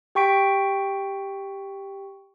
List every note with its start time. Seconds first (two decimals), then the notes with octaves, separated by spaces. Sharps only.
0.15 G4 G5 C#6 B6 D7